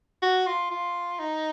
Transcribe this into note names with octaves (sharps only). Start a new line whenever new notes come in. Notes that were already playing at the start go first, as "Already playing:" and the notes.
F#4
F4
F4
D#4